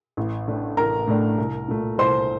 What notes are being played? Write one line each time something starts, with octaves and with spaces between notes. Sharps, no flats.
A1
A2 A3 D4
A1 A#4 A#5
A2 A3 D4
C2
A#2 A3
C2 C5 C6